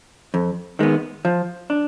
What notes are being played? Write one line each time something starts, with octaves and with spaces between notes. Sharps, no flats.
F2
D#3 G#3 B3
F3
D4